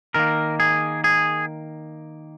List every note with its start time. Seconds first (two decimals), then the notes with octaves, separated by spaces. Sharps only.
0.14 D#3 A#3 A#4
0.60 G#4
1.04 G#4